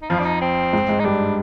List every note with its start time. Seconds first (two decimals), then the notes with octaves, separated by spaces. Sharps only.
0.02 D#4
0.10 F2 F3 F4
0.20 D4
0.26 D#4
0.41 C4
0.73 G#2 G#3
0.89 G#2 G#3
1.00 D#4
1.04 G2 G3 D4